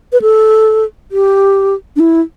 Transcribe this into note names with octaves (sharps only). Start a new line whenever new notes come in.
B4
A4
G4
D4
E4